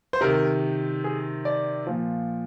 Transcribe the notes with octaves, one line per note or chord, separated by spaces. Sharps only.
C5
C3 D#3 A#4
G#4
D5
A#2 F3